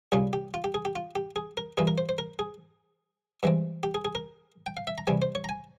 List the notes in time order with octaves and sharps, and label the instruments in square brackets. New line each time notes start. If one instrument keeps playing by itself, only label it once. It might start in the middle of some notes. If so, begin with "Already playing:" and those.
[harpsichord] C2 A#2 G3 C#4 F4 G#4
G4
F4
G4
G#4
G4
F4
G4
G#4
A#4
G2 E3 A#3 F4 G#4
A#4
C5
C5
A#4
G#4
G2 E3 G#3 C4
G4
G#4
G#4
A#4
G5
F5
E5
A#5
E2 C3 G3 G#5
C5
C#5
A#5
G#5